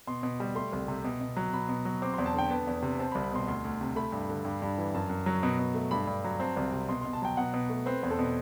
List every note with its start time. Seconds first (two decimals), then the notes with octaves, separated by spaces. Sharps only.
0.07 B2 C6
0.23 B2
0.40 G3
0.55 A3 C6
0.73 C2
0.88 C3
1.04 B2
1.21 B2
1.37 F#3
1.53 B2 B5
1.69 B2
1.85 F#3
2.02 C4 D6
2.14 C6
2.18 E2
2.26 A5
2.34 D3 G5
2.50 B3 A5
2.67 E2
2.82 C3
2.99 C4 A5
3.12 B5
3.15 C2
3.24 B5
3.32 B2 C6
3.47 D2 C6
3.65 D2
3.81 C3
3.96 A3 B5
4.12 G2
4.29 D3
4.45 G2
4.62 G2
4.78 E3
4.94 F#2 A5
5.10 F#2
5.26 F#3
5.43 B2 B5
5.59 B2
5.75 A3
5.91 G2 B5
6.07 G2
6.24 F#3
6.40 C4 A5
6.57 C2
6.73 C3
6.89 B2 C6
7.01 C6
7.05 B2
7.13 A5
7.22 F#3 G5
7.37 B2 F#5
7.53 B2
7.70 A3
7.86 C4 B4
8.03 E2
8.11 A4
8.19 B2